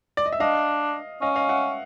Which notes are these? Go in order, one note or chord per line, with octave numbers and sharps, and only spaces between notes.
D5
D#5
E5
D4 D#5 F5
C#4 D#5 F5
D#5 F5
E5 F#5